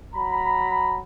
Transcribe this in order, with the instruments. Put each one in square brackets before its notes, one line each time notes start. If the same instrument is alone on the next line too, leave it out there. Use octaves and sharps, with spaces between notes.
[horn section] F#3 A#5 B5